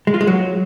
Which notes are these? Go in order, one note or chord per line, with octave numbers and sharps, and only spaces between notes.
G#3
F4
G#3
F#3